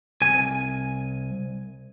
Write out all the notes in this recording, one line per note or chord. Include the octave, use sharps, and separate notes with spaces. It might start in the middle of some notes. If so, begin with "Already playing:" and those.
C2 G#5